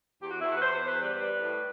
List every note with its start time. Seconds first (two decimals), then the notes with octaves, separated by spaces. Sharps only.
0.20 E2 G4
0.31 F#4
0.40 E2 E4
0.51 F#4 B4
0.60 E2 C5
0.74 C5
0.80 E2
0.87 B4
1.00 G3 B4
1.21 G3
1.41 A2